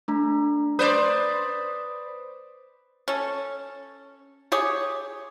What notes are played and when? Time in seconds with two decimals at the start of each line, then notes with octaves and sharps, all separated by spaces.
0.08 A3 D4 A#5
0.79 B4 C5 D5 D#6
3.08 C#4 A4
4.52 G4 G#4 C#5